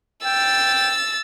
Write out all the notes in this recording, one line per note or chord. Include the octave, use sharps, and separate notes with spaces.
G5 E6 A6